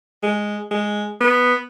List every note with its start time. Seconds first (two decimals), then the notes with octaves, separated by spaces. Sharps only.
0.23 G#3
0.71 G#3
1.20 B3